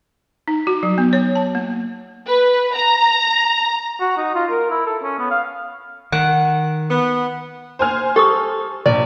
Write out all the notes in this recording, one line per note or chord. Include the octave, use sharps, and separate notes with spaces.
D#4
F#4
F#3
B3
C#5
A5
A#3
B4
A#5
F#4
D#4
F4
A#4
E4
A4
C#4
B3
F5
D#3 F#5
B3
C5 G#5 F6
G4 A4 C#6 D#6
A#1 D5